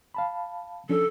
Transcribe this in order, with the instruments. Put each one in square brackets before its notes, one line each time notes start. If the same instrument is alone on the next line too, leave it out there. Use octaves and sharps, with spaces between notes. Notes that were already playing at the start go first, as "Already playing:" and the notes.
[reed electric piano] F5 A5 B5
[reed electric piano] F3 C#4 D4 [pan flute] A4